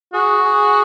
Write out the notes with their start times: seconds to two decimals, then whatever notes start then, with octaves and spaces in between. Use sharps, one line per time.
0.13 F#4 G#4
0.44 G#4